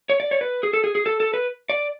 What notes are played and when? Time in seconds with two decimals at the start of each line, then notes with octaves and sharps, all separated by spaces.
0.10 C#5
0.20 D5
0.31 C#5
0.41 B4
0.63 G#4
0.73 A4
0.84 G#4
0.95 G#4
1.06 A4
1.20 A4
1.34 B4
1.69 D5